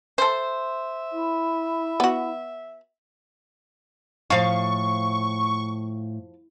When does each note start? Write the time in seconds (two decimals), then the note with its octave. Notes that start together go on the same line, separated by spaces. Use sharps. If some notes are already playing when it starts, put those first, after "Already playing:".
0.18 A4 C5 E5
1.12 E4
2.00 B3 F#4
4.30 A2 F3 F5 C#6